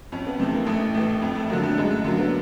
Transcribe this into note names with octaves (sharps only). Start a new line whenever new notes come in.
F2 C#4
B3
C3 E3 A3
A#3
A1 A3
A2 E3 A3
F2
A3
D3 F#3 A#3
A3
F#2 G#3
A3
D3 F#3 A#3
B3